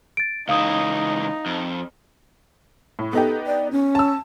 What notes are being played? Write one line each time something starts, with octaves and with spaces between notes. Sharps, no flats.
A6 D7
C#2 E3 D#4 F5 D#6
F2
A2
B3 D#4 G4 A4
D5
C#4
A5 E6